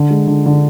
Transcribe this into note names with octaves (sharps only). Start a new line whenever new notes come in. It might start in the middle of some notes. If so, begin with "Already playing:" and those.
Already playing: D3
G#3
D3
D3